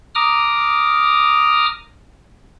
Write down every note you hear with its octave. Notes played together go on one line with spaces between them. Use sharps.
A#5 D6 D#6 F6